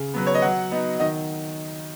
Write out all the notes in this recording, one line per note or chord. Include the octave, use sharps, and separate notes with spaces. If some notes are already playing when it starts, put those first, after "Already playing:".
Already playing: C#3
F#3 B3 B4
C#5
D#5
F#3 F#5
B3 D#4
D#3 D#5